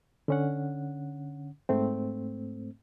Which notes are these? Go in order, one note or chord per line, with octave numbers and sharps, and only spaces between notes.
D3 C#4 F#5
G#2 A3 C4